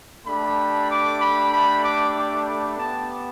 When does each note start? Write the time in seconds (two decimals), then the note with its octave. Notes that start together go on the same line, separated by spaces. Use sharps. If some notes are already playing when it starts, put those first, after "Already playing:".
0.25 A3 D4 G4 B5
0.88 D6
1.20 B5
1.51 B5
1.82 D6
2.13 D6
2.44 B5
2.76 B3 G4 A5